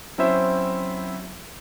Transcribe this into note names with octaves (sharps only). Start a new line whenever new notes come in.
F#3 C4 C#4 E4 C5 E5